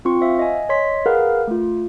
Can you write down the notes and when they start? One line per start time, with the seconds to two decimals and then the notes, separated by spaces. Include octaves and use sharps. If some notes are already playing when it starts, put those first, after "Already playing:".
0.05 C4 F4 C6 C#6
0.21 C5 E5 F5
0.39 D#5 G#5
0.69 C#5 D#5 C6 B6
1.06 G#4 A#4 B4 F5 F#5
1.48 A3 F4